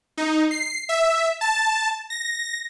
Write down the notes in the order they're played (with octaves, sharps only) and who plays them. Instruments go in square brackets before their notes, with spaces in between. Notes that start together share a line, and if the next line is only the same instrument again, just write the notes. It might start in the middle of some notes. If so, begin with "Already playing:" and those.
[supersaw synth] D#4
C7
E5
A5
A#6